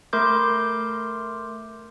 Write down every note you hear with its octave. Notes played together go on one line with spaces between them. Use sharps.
A3 A#4 C6 D6 G6